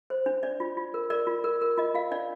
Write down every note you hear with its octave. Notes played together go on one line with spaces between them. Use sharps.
C5
D4
D4 D5
F4
F4
A#4
A#4 D5
F4
A#4
A#4
F4 D#5
F4 F5
D4 D5